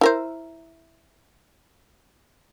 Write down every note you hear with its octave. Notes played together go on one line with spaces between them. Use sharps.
E4 A#4 C5